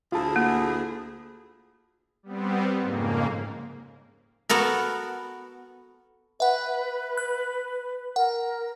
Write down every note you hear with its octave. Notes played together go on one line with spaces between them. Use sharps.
D2 E4 F4 G#4 A5
A#3
G3 B3 C4
F2 G#2 C#3 A#3
B3 F#4 A4 A#4
B4 E5 F#5
F#6
A#4 F#5